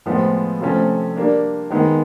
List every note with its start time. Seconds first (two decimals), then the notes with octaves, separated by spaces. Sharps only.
0.06 A2 F3 G#3 B3
0.61 C3 F3 A3 C#4
1.17 G3 A#3 D4
1.70 D#3 G#3 B3